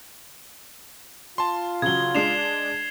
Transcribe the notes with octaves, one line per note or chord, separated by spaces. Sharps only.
F4 A5 C6
C#3 F#3 G#6 G7
G#3 D4 C7 E7 F7